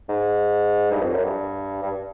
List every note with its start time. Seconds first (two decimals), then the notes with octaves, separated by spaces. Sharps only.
0.09 G#2
0.91 G2
1.02 F2
1.13 F#2
1.24 G2
1.82 G2